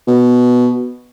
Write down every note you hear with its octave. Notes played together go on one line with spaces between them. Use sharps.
B2